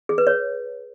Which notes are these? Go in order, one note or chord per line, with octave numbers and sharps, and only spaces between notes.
G#4
B4
C#5